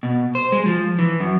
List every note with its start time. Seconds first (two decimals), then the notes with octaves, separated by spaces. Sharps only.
0.03 B2
0.35 C5
0.52 G#3
0.66 F3
0.99 E3
1.20 F#2